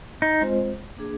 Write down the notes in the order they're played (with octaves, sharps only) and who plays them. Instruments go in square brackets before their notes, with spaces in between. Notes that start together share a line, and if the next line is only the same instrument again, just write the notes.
[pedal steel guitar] D#4
[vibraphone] G#3 C4 F4 C5 D#5
A#3 D4 G#4